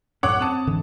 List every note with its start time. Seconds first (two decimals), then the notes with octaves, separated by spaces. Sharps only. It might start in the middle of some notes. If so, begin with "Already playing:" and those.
0.23 F#2 A2 C#4 C#5 F#5 D6
0.41 C4 A5 D#6
0.67 G#2 D3 E3